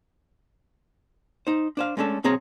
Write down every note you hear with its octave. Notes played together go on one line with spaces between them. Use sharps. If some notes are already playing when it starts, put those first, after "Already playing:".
D#4 C5
D4 C5 F5
G#3 A3 C#4 D4 A4
B1 C4 G#4 C#5 A#5